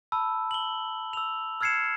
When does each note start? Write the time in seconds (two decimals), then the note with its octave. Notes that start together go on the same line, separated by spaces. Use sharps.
0.12 A5 B5 E6
0.51 F#7 G7
1.13 E6 F7
1.61 E6 F6 G#6 C7 C#7 E7